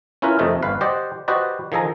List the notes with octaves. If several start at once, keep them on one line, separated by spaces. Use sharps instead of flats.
C#4 E4 F4 A#4 B4
F2 C3 A3 D#4
G1 B4 F5
G4 C5 D5 D#5 F#5
F#4 G4 B4 C5 D5 D#5
D#3 F3 G#4 A4 A#5